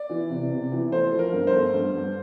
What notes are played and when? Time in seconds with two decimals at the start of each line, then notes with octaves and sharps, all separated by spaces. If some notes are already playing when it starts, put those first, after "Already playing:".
Already playing: D5
0.10 E3
0.30 C3
0.51 C3
0.72 E3
0.92 A3 C5
1.12 F3
1.19 A#4
1.33 G2
1.47 C5
1.54 A3
1.74 G2
1.94 G2